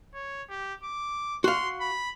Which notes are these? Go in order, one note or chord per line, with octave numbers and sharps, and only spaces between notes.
C#5
G4
D6
F#4 F5 C6
B5